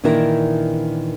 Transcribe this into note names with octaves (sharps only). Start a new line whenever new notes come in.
A#2 D#3 E3 D4 E4 A#4